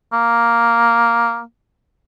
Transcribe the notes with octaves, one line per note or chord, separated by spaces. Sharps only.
A#3